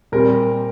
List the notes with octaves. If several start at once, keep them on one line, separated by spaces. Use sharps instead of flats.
A#2 G3 C4 A#4